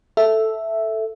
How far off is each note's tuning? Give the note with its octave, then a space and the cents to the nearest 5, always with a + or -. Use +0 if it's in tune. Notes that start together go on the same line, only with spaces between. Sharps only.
A4 +0 E5 +0